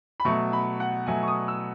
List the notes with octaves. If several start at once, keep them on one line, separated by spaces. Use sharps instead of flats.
B5
B2 F#3 A3 C#6
B5
F#5
B2 F#3 A3 G#5
C#6
D#6
E6